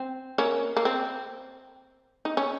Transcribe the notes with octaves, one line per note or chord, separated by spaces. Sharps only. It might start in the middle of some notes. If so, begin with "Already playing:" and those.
Already playing: C4
A#3 C#4
A#3
C4
D#4
C#4